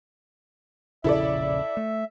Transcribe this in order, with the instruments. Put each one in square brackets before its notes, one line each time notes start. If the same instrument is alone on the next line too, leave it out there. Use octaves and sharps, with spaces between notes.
[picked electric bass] E1 A#1 C#3 [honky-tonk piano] E4 A4 D5 [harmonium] E5
[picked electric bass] A3